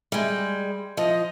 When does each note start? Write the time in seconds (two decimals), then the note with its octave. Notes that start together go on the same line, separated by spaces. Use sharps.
0.12 G3 G#3
0.97 F3 D#5